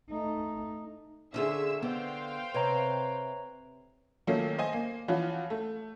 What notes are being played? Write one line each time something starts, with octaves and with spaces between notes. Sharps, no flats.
A3 D#4
D3 C#4 F4 G#4 E5 E6
D3 B3 C5 F5 G5
C3 B4 C#5 A#5
D#3 F3 F#3 A3 A#3 C#4
C5 D#5 G#5
A#3
E3 F3 C#4 F4 F#4
A3